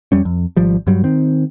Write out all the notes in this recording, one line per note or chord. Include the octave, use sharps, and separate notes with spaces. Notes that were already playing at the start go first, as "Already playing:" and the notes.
F2 G3 C#4
F2
G#1 F3 G3
G2 F#3 G3
D#3 C4